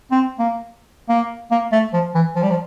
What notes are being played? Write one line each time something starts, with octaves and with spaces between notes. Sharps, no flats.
C4
A#3
A#3
A#3
A3
F3
E3
F3
G3
F3